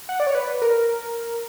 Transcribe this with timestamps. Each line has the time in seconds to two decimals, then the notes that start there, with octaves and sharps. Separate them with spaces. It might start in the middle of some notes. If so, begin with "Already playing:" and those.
0.09 F#5
0.20 D5
0.27 C#5
0.35 B4
0.62 A#4